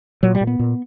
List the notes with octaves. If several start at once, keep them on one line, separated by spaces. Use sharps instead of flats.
A#2 F#3
G3
A#2
B3
A#2